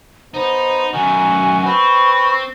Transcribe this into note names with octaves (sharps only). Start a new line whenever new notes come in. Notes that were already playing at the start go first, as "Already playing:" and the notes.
B3 D#4 C5
F#2 D#3 F#4 G#5
C4 B4 C#6